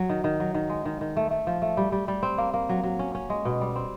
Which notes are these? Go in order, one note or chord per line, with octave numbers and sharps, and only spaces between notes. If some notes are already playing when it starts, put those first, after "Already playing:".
Already playing: F#3
D#3
D#3
F#3
D#3
G#3
D#3
D#3
A3
A3
F3
A3
G3
G3
G3
C4
A#3
A#3
F#3
F#3
C#4
C#4
G#3
B2
G3
C4